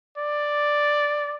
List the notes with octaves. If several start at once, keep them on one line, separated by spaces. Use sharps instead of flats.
D5